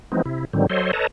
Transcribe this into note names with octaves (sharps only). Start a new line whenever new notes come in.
E3 F3 G#3 B3 C4 D#4
C3 E4
G#2 D3 D#3 F#3 G3 C4
F#3 A4 C5 C#5 D#5 C6
A4 B4 C#5 D#5 A5 A#5